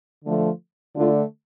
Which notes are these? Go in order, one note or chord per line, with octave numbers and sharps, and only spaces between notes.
D3 F3 A3
D3 A3 D4 F4